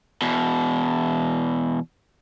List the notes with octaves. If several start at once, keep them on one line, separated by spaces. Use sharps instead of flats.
E2 B2